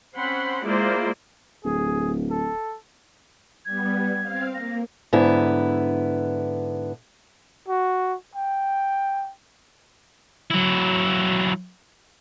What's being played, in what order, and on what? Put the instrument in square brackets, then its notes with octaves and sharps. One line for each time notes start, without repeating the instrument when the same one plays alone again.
[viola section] C4 C#4 F#5 B5 C6
G#3 A#3 E4 F4 C5 D5
[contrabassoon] D1 [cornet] G#4
[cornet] A4
[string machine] G3 B3 [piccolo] G#6
[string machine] C4 F5
[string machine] A#3 [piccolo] A#6
[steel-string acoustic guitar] G#2 D3 B3 E4
[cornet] F#4
G5
[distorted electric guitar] F#3 E4